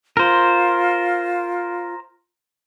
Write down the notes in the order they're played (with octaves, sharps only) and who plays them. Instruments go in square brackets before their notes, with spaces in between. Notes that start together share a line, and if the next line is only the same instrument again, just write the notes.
[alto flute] F4 [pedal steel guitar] A#4 C5